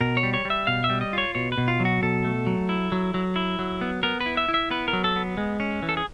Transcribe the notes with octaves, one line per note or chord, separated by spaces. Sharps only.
B2 A#4
C#5
G3
C#5
G3
E5
B2 F5
E5
G3
D#5
F4 C#5
B2 C#5
B4
B2
F4
F#3
F#4
B2 A4
A3
F#3
E4
F#3
F#3
E4
F#3
B3
B3 A#4
B4
E4
E5
E4
E5
B3 B4
A#4
F#3
A4
B3
G#3
C#4
E3
A4
G#4